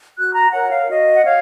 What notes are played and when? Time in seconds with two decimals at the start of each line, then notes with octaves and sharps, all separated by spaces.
0.16 F#4 F#6
0.34 A#5
0.52 A#4 C#5 F#5
0.71 F5
0.88 F#4 D#5
1.14 F#5
1.24 C#5 F5